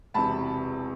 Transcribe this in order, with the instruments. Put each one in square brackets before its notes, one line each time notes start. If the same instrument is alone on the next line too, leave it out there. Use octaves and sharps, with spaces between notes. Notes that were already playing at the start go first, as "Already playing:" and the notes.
[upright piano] E1 E2 C3 A5 B5